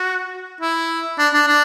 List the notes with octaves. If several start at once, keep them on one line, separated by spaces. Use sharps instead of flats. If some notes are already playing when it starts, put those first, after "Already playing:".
Already playing: F#4
E4
D4
D4
D4